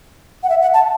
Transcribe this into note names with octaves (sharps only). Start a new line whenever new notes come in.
F#5
E5
F#5
A5